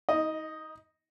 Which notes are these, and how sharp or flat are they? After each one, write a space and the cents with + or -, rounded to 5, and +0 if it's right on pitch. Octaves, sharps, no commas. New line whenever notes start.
D#4 +35 D#5 +0